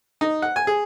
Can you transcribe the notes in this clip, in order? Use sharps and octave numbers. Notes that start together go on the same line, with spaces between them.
D#4
F#5
G#5
G#4